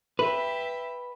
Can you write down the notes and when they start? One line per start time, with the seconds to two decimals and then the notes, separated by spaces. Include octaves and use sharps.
0.19 G4 B4 E5